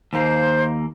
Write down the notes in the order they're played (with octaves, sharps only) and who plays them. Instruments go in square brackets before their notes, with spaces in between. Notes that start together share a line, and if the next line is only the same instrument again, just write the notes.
[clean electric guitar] D#2 A#3 [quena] C5